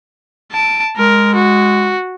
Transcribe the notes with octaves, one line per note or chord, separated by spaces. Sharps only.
A5 D7
G#3 A#4
F#4